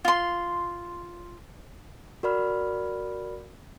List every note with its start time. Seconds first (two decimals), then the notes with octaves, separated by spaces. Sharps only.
0.05 F4 C6
2.23 F#4 A#4 D5 B5 F6